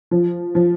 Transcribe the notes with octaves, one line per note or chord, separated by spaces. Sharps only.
F3
F3